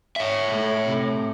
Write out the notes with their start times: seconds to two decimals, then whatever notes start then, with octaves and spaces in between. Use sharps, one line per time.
0.16 C#5 E5
0.49 A2
0.85 A2 C3